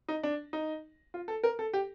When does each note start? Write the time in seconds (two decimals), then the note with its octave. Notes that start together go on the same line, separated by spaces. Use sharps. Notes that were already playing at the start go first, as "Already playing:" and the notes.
0.08 D#4
0.23 D4
0.53 D#4
1.14 F4
1.28 A4
1.44 A#4
1.59 A4
1.73 G4